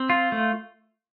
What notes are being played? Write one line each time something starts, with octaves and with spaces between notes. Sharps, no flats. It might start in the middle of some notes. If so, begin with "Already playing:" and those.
Already playing: C4
F4
A3